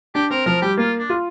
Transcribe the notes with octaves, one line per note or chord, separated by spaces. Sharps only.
D4 G4
C4 A#4
F3 A#4
G3 G4
A#3 F4
D4
F4